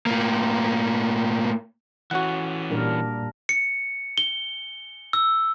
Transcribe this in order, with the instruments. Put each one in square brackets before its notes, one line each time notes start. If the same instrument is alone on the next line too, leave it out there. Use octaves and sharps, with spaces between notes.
[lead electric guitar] A2 A#3
[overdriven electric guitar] E3 C#4 [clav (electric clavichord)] F#4 F#5
[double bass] A#2 [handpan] G3 D4 A#4
[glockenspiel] C#7
G7
E6